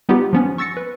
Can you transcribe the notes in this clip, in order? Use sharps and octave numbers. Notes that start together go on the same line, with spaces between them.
G3 B3 D#4 F4 G4
F3 B3 C#4
C#6 E6 A6 A#6 C#7
B4